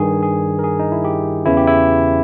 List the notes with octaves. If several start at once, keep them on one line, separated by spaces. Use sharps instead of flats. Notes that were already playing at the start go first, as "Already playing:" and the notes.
Already playing: G2 D#3 G#4
G#4
A#4
G#4
D#4
E4
G4
E2 C#3 E3 E4
G4
E4